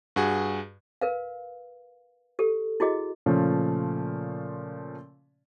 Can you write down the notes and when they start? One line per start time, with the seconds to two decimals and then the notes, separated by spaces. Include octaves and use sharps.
0.16 G2 F#4 G#4
1.01 A#4 B4 F5
2.39 G4 A4
2.80 E4 F#4 G#4 D#5
3.26 A#2 C#3 F3 A3 C#4